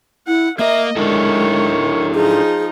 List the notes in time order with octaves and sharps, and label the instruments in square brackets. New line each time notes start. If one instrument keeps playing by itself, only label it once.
[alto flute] E4 [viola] F#5
[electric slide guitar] A#3 A#4 [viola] D#5 [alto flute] E5
[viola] D#3 C#5 [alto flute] G#3 [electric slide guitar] D4 E4 A4
[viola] F3 D#4 [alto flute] G#4